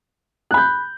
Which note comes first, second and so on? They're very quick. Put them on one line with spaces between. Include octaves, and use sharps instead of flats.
F#6 B5 G6